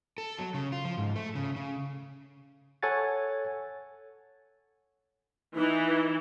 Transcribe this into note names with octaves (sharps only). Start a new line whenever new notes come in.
A4
F#3
C#3
F4
F3
G#2
A3
C#3
C#3
A4 C#5 F#5 G#5 A6
E3 D#4